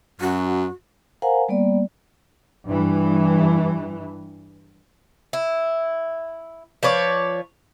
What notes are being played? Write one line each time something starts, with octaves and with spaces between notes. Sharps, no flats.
F#2 F#4
A#4 C5 F5 F#5 G#5 A#5
G3 A#3 B3 D5
G2 E3
E4
F3 B4 C#5 D5